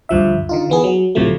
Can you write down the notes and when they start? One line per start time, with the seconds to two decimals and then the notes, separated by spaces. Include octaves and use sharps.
0.09 D2 G2 F3 E5
0.49 D3 D#4 F4
0.70 E3 B3 G#4
0.84 F#3
1.15 D2 A2 C3 F3 F#3 A3